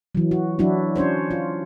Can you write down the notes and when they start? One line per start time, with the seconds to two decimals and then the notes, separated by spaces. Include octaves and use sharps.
0.15 E3 F#3
0.31 F#4
0.59 F#3 D4 E4 F#4
0.96 C#4 D4 C5 C#5
1.31 F4